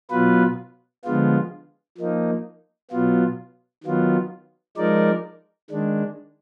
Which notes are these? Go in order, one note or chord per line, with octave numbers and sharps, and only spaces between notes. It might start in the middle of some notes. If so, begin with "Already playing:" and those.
B2 F#3 B3 F4 B4
D3 F3 G#3 B3 F4
F3 A#3 D#4
B2 F#3 B3 F4
D#3 F#3 B3 F4
F3 G#3 D#4 A#4 D5
D#3 G#3 D4